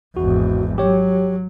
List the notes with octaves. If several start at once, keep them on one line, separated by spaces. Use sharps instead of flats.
G#1 E2 F#4
F#3 G4 C#5